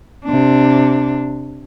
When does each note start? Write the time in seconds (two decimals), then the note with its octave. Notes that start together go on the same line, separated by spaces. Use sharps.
0.25 C3 D4